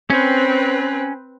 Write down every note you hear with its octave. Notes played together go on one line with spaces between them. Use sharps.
C4 C#4 B4